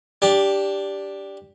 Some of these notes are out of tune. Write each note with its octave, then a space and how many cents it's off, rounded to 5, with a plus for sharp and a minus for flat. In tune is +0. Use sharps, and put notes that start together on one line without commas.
D4 -10 G4 +5